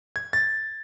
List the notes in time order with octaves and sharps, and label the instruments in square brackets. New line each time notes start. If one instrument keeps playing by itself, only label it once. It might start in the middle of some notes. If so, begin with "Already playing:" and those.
[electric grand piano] G#6
A6